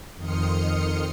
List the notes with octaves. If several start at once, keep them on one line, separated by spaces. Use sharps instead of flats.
F2 D#3 C6 D#6 F6 C#7